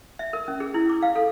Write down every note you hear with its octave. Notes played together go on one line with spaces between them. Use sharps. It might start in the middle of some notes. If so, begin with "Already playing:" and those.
E5
A#4
C#4
G#4
E4
D6
F5
A4